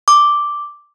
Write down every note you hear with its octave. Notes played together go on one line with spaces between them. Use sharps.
D6